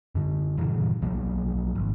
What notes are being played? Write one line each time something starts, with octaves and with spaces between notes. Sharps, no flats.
F#2 D3
G2 A#2 C#3 E3
B1 F3 F#3 A#3
G#1